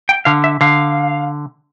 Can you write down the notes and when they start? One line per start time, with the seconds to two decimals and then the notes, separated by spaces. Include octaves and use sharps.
0.09 G5
0.25 D3 F5
0.44 E5
0.61 D3 F5